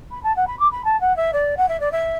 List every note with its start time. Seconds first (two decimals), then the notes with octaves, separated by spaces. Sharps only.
0.11 B5
0.23 A5
0.36 F#5
0.47 B5
0.59 D6
0.71 B5
0.85 A5
1.01 F#5
1.16 E5
1.33 D5
1.57 F#5
1.68 E5
1.80 D5
1.92 E5